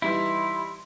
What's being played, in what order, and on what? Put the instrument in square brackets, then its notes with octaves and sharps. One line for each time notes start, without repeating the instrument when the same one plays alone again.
[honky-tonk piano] E3 G3 D#4 [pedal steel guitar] E4 [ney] C6